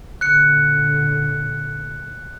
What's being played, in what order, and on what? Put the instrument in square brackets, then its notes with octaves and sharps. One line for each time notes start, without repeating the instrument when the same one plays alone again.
[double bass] A#2 D3 [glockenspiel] F#6 C#7